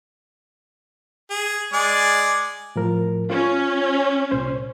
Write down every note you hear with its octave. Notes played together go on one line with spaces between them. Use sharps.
G#4
G#3 D5 G#5
A2 F3 A#4
C#4 F4
C2 A#2 C5